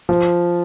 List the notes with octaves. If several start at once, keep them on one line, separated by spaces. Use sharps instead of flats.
F3